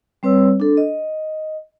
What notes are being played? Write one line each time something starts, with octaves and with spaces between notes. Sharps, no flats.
G3 C4 B4 C#5 E6
D4 A4
D#5